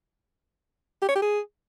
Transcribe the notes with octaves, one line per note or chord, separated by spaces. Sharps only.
G4
C#5
G4
G#4